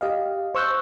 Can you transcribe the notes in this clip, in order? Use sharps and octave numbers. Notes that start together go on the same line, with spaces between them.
G4 D#5 F5
C5 C#6 E6 F#6 G6